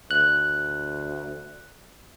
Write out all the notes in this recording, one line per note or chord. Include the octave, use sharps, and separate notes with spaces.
D2 F#6